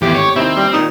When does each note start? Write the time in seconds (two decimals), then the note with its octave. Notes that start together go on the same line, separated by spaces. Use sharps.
0.02 G#1 E2 A2 G4
0.15 C#5
0.36 D#2 C3 C4 D#4 E4
0.56 G3
0.73 A#2 D#3 G3 D#4